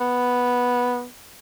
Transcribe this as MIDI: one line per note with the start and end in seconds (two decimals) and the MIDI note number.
0.01 1.05 59